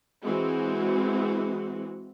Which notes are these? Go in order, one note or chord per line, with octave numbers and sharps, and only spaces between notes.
E3 G#3 C4 F#4